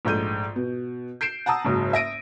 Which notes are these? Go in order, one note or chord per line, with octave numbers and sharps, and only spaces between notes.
A#1 G#2 A3 G6 D#7
B2
G6 C7 D7 E7
F#5 A5 A#5 D#6 E6
F#1 G#2 F#3
E5 A#6 D7 D#7